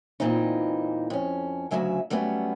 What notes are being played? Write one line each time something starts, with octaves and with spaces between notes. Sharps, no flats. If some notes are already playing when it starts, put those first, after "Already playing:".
E2 A#2 E3 C4 D#4
F2 C#4
D2 G#2 C#3 F#3 E5 G#5
F#3 G3 A3 B3 C#4